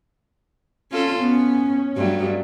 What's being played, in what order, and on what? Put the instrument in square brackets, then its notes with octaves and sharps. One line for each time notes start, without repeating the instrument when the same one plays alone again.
[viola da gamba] C#4 F4 A4
[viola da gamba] B3 [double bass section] C#4
[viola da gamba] G2 F#3 A3